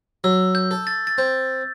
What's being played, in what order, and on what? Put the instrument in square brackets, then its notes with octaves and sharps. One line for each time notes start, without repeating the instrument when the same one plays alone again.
[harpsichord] F#3 [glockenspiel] E6
[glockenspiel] G6
[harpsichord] A4
[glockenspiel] A6
A6
[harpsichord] C4 [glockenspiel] G6